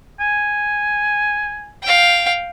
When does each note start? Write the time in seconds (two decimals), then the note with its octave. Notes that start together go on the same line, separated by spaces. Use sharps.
0.20 G#5
1.83 F5 G5